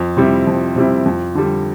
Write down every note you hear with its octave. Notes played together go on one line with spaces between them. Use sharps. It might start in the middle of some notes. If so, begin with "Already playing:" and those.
Already playing: F2
C3 G3 C4 E4
F2
C3 G3 C4 E4
F2
D3 G3